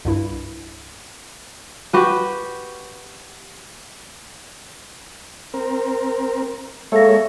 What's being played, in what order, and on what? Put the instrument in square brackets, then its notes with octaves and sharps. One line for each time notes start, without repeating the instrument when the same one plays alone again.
[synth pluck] C2 G2 E4
[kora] F#4 G4 B4
[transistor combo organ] C4 A#4
[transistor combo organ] G#3 A#3 C#5 [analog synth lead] A4 [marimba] E5 F5 A#6